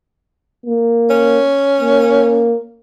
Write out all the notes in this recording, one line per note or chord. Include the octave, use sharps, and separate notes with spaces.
A#3
C#4
A#3